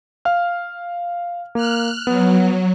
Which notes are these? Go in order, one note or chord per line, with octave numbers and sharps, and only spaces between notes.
F5 F6
A#3 F6 F#6
F#3 B3